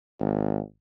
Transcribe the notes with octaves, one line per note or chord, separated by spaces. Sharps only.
G#1